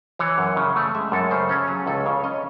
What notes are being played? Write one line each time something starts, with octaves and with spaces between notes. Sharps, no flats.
E3 C#5
F#2
C#3
A3
G#3 E5
F#2 A4
C#3 C5
C#4 A4
F#3 G#4
C#2 A4
C#3 C#5
C#4 D#5